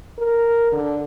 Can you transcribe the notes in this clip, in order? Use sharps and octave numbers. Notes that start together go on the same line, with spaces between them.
A#4
D3